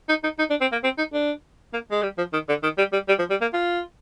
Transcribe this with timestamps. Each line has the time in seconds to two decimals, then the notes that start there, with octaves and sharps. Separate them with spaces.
0.09 D#4
0.24 D#4
0.39 D#4
0.50 D4
0.61 C4
0.72 A#3
0.84 C4
0.98 D#4
1.13 D4
1.73 A#3
1.91 G#3
2.03 G3
2.18 F3
2.33 D#3
2.49 D3
2.63 D#3
2.78 G3
2.93 G3
3.08 G3
3.19 F3
3.30 G3
3.41 A#3
3.53 F4